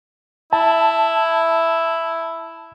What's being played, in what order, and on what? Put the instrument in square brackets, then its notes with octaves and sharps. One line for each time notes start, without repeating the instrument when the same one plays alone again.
[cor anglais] E4 [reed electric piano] A5